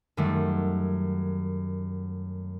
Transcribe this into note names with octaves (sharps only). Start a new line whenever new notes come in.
F#2 D#3 G3 A3